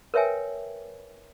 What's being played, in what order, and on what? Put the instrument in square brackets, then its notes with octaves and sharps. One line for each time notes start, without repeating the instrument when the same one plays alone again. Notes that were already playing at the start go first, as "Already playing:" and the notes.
[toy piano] A#4 B4 C#5 E5 G5 G#5